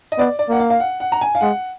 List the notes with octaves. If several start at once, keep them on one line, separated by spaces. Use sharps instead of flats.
D#5
B3 D5
D5
A#3 F#5
F5
F5
F#5
F#5
A#5
G#5
F5
G#3 F#5